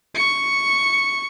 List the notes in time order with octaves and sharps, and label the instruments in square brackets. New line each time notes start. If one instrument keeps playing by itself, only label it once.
[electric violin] C#6 C#7